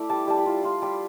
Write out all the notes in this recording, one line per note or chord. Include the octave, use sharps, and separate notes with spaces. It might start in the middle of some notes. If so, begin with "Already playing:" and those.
Already playing: A3 E4 D5 E5
G3 A5
G3 A5
B5
F4
F4 C6
G3 B5